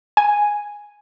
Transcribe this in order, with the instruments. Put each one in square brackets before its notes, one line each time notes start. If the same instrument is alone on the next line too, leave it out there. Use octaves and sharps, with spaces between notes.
[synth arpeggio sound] G#5